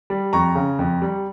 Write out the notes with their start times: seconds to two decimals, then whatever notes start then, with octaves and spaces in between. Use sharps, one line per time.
0.10 G3
0.33 F2 A#5 C#6
0.55 C#3
0.79 F2
1.02 G3